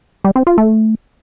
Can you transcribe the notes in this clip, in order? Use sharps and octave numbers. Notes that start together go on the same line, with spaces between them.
G3
C4
F4
A3